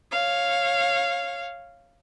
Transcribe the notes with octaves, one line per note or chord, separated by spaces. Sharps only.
C#5 F5